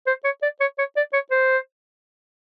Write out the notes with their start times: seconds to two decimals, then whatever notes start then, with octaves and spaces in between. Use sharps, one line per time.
0.07 C5
0.24 C#5
0.42 D5
0.60 C#5
0.78 C#5
0.96 D5
1.13 C#5
1.31 C5